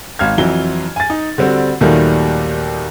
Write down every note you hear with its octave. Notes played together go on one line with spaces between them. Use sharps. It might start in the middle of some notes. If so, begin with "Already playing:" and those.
G#1 F5 F6 G#6
F2 E3 F#3 G7
G#5 A6
D#4
D3 G3 C4 F#4
D#2 A#2 D#3 F#3 G3 A3